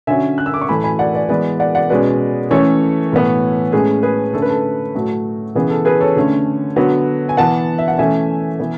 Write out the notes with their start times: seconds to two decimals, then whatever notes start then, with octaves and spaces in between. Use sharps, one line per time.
0.07 D3 F#3 C#4 E5 G#5
0.38 F#6
0.46 E6
0.54 D6
0.62 C#6
0.69 A2 E3 A3 G#5 B5
0.84 G#5 B5
0.99 D5 F#5
1.14 B4 D5
1.29 E3 G#3 B3 B4 D5
1.60 D5 F#5
1.75 D5 F#5
1.90 B2 G#3 C#4 B4 D5
2.50 E3 A3 C#4 A4 C#5
3.12 A2 E3 B3
3.72 A2 G#3 C#4 G#4 B4
4.03 G#4 B4
4.33 D3 A3 C#4 A4
4.42 B4
4.50 A4
4.95 A2 F#3 A3
5.55 C#3 E3 B3 G#4
5.70 A4
5.85 G#4 B4
6.01 A4 C#5
6.16 D3 A3 C#4
6.76 D3 F#3 B3
7.29 G#5
7.37 E3 B3 F#5 A5
7.79 E5
7.88 F#5
7.98 E3 A3 C#4 E5 G#5
8.60 E3 B3